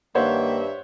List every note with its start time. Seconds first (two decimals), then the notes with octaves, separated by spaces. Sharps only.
0.15 G2 D#3 A#3 C5 C#5 E5 F#5